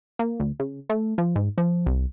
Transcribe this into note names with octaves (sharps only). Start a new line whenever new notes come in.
A#3
D2
C#3
A3
F3
G#2
F3
C2